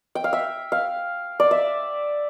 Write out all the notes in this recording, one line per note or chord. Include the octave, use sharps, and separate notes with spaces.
G5
F5
E5
F5
D5
E5